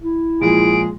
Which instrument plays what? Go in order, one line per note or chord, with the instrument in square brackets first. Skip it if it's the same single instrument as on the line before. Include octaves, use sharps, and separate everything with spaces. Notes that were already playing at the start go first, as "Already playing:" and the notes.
[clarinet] E4
[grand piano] A#2 F3 G#3 [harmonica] G#4 [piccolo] D7